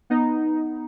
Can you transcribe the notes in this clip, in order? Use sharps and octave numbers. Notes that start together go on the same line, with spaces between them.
B3 D#4